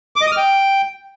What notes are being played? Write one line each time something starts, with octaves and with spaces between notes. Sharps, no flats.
D6
D#5
D#6
F6
G5